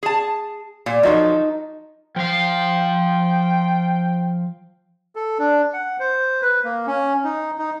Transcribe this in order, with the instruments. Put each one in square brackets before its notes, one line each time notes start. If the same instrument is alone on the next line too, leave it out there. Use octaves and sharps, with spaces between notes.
[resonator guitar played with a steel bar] G#4 A5
A#2
[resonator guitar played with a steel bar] F3 F#3 A4 [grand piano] D#4
[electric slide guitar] F3 F5 [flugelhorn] G5
[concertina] A4
D4
F#5
C5
B4
A#3
C#4
D#4
D#4